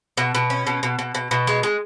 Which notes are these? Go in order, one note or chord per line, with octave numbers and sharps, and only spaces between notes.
B2
B2
C#4
B2
B2
B2
B2
B2
G#3
G#3